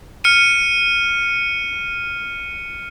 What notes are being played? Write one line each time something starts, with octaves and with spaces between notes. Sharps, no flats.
F6 C#7 D#7